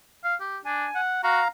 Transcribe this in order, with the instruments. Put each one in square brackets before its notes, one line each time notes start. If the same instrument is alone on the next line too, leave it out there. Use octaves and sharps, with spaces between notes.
[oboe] F5
G4
[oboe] D4 [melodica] G#5
[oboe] F#5
[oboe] F#4 [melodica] F5 A#5